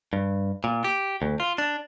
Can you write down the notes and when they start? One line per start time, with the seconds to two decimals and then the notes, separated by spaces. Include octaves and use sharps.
0.13 G2
0.64 A#2
0.84 G4
1.22 D2
1.40 F4
1.58 D4